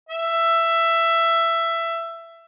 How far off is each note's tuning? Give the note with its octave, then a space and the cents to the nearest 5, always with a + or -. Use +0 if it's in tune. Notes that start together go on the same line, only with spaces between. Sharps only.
E5 +15